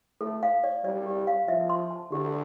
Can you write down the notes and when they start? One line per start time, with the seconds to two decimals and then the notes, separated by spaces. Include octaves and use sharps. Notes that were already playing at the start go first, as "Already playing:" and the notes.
0.21 A3 A4
0.43 F5
0.64 D5
0.84 G3 D5
1.06 G4
1.27 F5
1.48 F3 E5
1.70 C6
1.90 A5
2.12 D3 G4